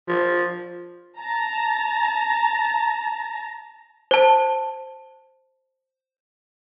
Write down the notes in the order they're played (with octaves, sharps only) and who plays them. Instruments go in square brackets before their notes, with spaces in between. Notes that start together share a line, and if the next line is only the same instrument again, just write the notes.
[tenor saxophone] F3
[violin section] A5 A#5
[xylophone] C5 A5